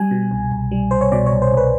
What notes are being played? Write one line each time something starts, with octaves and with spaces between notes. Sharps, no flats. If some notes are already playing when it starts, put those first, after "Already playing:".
Already playing: G3 G#5
B2
C2
C2
G3
C2 C5
C#5
B2 D5
C#5
C2
C5
C2
B4